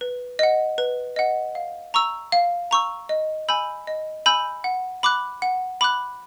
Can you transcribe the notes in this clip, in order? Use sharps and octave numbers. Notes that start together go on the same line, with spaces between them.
B4
D#5 F#5
B4
D#5 F#5
F5
A#5 C#6 E6
F5
A#5 C#6 E6
D#5
G#5 B5 E6 G6
D#5
G#5 B5 E6 G6
F#5
B5 D6 F#6
F#5
B5 D6 F#6